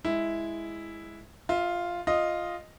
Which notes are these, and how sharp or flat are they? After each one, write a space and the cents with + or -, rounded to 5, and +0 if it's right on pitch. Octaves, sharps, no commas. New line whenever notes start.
G#3 +0 E4 +0
F4 +0 E5 -35
F4 +0 D#5 +0